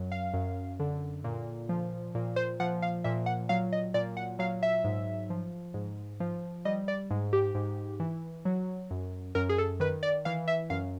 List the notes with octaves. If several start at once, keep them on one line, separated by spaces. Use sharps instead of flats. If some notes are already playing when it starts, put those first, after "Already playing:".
Already playing: F#2 F#3
F5
F#2
D3
A#2
F3
A#2
C5
F3 F#5
F5
A#2 E5
F#5
F#3 F5
D#5
A#2 D5
F#5
F#3 F5
E5
G#2
F3
G#2
F3
G3 D#5
D5
G#2
G4
G#2
E3
F#3
F#2
F#2 A#4
G#4
A4
D#3 B4
D5
E3 F5
E5
F#2 F5